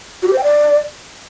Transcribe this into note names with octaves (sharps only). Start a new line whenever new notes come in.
F#4
G4
C5
G5
D5